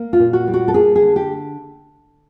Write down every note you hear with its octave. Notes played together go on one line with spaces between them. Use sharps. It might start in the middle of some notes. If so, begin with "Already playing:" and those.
Already playing: A#3
F4
A#2
F#4
G3
F#4
A4
A#3 G#4
G#4
D3
G4